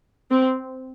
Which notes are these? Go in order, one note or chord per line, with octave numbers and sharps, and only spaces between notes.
C4